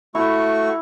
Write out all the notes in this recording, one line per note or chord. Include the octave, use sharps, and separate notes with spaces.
A3 E4 F#4 C#6